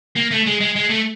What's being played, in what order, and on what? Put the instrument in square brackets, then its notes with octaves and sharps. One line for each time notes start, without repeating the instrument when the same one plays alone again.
[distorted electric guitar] A#3
A3
G#3
G#3
G#3
A3